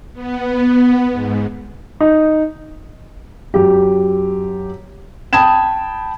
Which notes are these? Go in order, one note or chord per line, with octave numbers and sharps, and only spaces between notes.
B3
G#2
D#4
F#2 G4
G5 A5 B5 D#6 G#6 E7